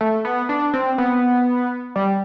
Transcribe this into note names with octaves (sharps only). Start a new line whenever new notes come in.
A3
B3
D4
C4
B3
G3